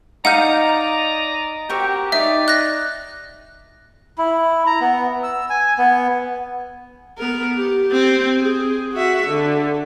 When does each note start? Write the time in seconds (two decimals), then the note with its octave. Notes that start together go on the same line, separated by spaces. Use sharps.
0.25 D#4 D5 D#5 F5 F#5 A#5 G6
1.70 C4 F#4 G4 A#4 C#6
2.12 D#4 D5 E5
2.48 F#6 A#6
4.18 E4
4.67 A#5
4.81 B3
5.23 E6
5.50 G#5
5.78 B3
7.18 B3 A#4
7.57 G4
7.92 C4
8.41 G#4
8.93 F#4 E5
9.27 D3